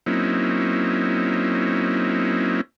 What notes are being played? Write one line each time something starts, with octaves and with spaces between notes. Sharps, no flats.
F#3 A#3 C4 C#4 D#4 E4